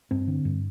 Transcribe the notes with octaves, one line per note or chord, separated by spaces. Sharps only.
G2 C4
D3
G2